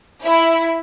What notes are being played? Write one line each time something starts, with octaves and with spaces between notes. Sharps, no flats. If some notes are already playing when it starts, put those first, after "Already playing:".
E4